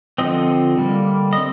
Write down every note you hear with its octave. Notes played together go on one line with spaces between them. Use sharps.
D3 F3 C4 D#5
D3 G3 A#3
D#5
C4